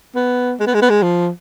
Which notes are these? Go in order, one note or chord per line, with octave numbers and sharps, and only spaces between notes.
B3
G#3
B3
G#3
B3
G#3
F3